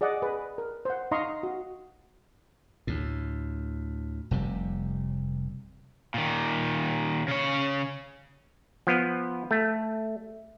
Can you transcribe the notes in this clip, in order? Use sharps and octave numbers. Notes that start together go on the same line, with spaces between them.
G#4 D5 D#5 F#5
G#4 B4
A#4
C5 F#5
D#4 D#5 F5 A#5 C6 C#6
F#4
D2 A2
F1 C3 G3
A#2 D#3
C#3 C#5
F3 B3
A3